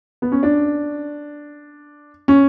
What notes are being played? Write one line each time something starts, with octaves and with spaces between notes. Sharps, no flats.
B3
C#4
D4
C#4